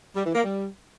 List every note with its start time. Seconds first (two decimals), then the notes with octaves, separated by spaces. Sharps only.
0.15 G3
0.24 E3
0.34 A#3
0.43 G3